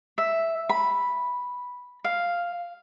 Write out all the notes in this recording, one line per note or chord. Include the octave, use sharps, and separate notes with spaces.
E5
B5
F5